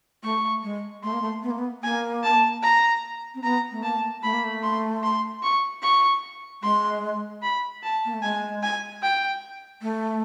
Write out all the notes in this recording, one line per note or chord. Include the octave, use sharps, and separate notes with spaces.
A3 C#6
G#3
A3 C6
A#3
A3
B3
A#3
B3
A#3 G#5
A5
A#5
C4
B3 A#5
A3
A#3 A5
A3 B5
A#3
A3
C6
C6
C#6
C#6
G#3 C6
B5
A5
A#3
A3
G#3 G#5
G#5
G5
A3